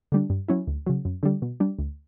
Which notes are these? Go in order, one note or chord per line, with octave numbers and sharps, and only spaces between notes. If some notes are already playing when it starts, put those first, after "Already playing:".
D3 G3 D4
G2
F#3 C#4 E4
D2
C#3 F#3
F#2
D3 G3
B2
G3 D4
D2